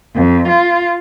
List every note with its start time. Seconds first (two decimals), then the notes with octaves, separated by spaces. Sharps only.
0.16 F2
0.47 F4